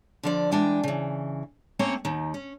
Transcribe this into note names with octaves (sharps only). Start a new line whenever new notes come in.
D3 F3 D5
E3 G#3 D4 G5 G#5
C#3 E3
A3 A#3 C4 C#4 C#5
D#2 D#3
C#4